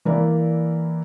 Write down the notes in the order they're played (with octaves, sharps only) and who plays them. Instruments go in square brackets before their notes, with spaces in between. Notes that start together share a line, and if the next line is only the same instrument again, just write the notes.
[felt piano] E3 A#3 E4 A#4 D5